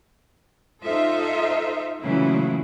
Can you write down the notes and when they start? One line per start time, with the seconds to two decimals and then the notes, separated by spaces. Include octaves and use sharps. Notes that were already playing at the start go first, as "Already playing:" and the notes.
0.84 D#4 F4 A4 C5 E5
2.03 A#2 C#3 E3 F#3 A3 E4